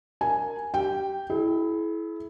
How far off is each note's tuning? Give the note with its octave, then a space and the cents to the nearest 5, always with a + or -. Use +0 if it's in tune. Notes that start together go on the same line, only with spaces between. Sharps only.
A#4 +0 G#5 +0
G4 -20 G5 +0
E4 +0 G#4 +45